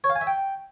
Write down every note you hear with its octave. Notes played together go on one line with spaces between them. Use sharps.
C#5
F5
G#5
E5
G5